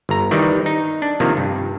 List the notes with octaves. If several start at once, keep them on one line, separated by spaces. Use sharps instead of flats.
G1 A#5
D#3 E3 G3 D#4
D#4
D4
C3 D#3 F3 A#3
G2